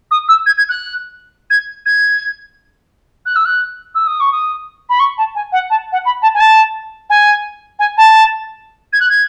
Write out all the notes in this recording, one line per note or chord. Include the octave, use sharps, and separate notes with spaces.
D#6
E6
G#6
G#6
F#6
G#6
G#6
F#6
E6
F#6
E6
D#6
C#6
D#6
B5
C#6
A5
G#5
F#5
A5
F#5
B5
A5
G#5
A5
G#5
G#5
A5
G#6
F#6
G#6